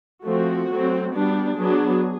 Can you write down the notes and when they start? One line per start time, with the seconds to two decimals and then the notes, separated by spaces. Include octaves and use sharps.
0.25 F3 A3 C4 F#4
0.68 F#3 A3 C4
1.13 G3 B3 D4
1.56 F#3 B3 D4 G#4